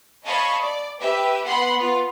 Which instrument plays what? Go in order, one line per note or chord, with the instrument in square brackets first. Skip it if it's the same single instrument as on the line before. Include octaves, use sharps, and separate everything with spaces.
[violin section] C#5 D#5 F5 A5 B5 C#6
D5
G4 B4 E5
B3 F#5 B5 C6 F#6
B3 F4